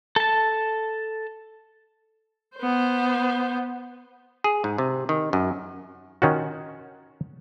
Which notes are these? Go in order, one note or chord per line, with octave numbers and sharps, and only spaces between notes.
A4 A5
B3 C5
G#4
G#2
C3
D#3
F#2
D#3 C#4 F4 F#4